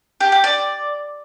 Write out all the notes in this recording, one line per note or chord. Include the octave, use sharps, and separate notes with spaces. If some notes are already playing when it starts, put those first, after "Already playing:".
G4
G4
D5